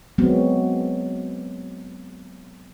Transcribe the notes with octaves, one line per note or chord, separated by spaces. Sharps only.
F#3 G#3 B3 C4